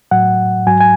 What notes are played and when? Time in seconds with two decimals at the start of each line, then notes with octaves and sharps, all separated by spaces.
0.11 A2 F#3 F#5
0.67 G#2 F#3 G#5
0.80 G#5